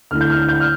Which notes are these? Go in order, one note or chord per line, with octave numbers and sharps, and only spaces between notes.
D2 D3 A3 E4 F6
G6
F6
G6
F6